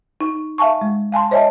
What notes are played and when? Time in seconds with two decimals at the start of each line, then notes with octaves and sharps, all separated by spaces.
0.21 D#4
0.58 E5 F5 G#5 A5 C#6
0.81 G#3
1.12 F5 G#5 A5 C6
1.31 C5 C#5 D#5 E5 G#5 A5